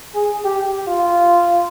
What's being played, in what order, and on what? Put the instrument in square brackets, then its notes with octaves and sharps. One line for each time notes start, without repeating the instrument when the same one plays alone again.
[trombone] G#4
G4
F4